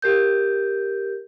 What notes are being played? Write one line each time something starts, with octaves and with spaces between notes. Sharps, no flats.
G4 A#4 G6